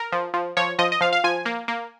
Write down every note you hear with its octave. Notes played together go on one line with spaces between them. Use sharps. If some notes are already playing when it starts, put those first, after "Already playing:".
Already playing: A#4
F3
F3
F3 C#5
F3 D#5
D#5
F3 F5
F5
F3 G#5
A#3
A#3